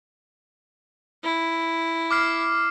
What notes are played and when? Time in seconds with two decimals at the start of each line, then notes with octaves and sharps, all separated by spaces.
1.24 E4
2.11 D6 F6 C7